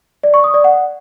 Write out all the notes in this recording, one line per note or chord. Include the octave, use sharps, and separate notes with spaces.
D5
C#6
D#6
D5
F#5